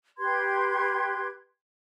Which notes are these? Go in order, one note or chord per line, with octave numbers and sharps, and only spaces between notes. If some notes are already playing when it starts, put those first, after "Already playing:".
G4 B4 C6 G#6